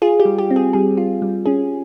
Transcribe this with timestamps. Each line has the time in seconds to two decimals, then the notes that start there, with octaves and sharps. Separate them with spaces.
0.02 F4 G#4
0.20 G4
0.25 G3
0.38 G4
0.50 C4
0.56 G#4
0.73 G3 G#4
0.97 F4
1.22 G3
1.46 C#4 G#4